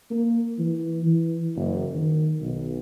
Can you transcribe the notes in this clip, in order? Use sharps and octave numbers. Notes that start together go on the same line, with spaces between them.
A#3
E3
E3
F#1
D#3
B1